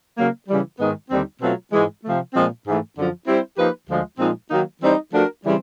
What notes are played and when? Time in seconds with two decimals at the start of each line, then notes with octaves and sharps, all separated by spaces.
0.18 C#3 F#3 A#3
0.48 C#3 E3 G3
0.79 G#2 D#3 G#3 B3 D#4
1.10 D#2 D3 G3 C4 D#4
1.41 B2 F#3 A3 C4 F4
1.72 G#2 E3 G#3
2.02 C3 F3 A3
2.34 A#2 F3 G#3 C4
2.65 G#2 E3 A3
2.96 F#2 D3 F3
3.27 G3 C4 E4 G4 C5
3.57 F3 A#3 D#4 G4 B4
3.88 D2 D3 F3 G#3
4.19 A#2 F3 G#3 C4 D#4
4.50 D#3 F#3 A#3 D#4 F#4
4.81 E3 G3 C4 D#4
5.11 F3 A3 D4 F#4 A#4
5.44 C#3 E3 G3 C4